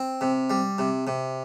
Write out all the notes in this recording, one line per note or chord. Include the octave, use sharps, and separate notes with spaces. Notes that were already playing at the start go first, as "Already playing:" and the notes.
Already playing: C4
C3
G3
C3
C3